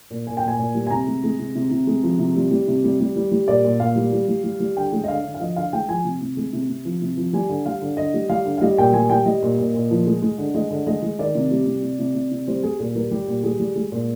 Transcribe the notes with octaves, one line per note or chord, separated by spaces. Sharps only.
A#2
A#2 G#5
G5
A#2
G#5
A#2
G3
G#5
C3 A#5
G#3
G#3
C3
C3
C3
G#3
F3
C3
G3
G3
C3
G3
G3
G3
G3
A#2 D5
A#2
A#2 F5
G3
G3
G3
G3
G3
D3 G5
G#3
D#5
D3 F5
D3
F5
F3 D#5
D3 F5
G#3 G5
F3 G#5
C3
C3
G#3
C3
C3
F3
C3
F3
G3 G#5
D3
G3 F5
D3
D3 D#5
G3
G3 F5
D3
F5
G3 D#5
A#2 G5
G3 G#5
G3 G5
G3 D#5
A#2
A#2
A#2
F3
G#3
G#3
D3
G#3 D#5
D3
G#3 D#5
G#3
D#3 D5
C3
G3
C3
C3
C3
C3
C3
G3 C5
G3 G#4
A#2 G#4
G3 A#4
G3 G4
A#2
G3 G#4
G3
G#3
A#2